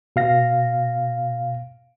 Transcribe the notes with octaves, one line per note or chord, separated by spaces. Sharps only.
B2 F5 A#6